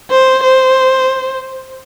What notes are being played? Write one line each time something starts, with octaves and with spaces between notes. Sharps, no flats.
C5
C5